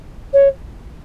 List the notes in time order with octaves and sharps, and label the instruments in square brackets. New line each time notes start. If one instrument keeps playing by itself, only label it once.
[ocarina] C#5